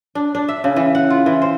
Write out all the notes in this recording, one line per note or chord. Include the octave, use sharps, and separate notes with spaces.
D4
D4
E5
C#3
E3
F#5
F4
E3
C5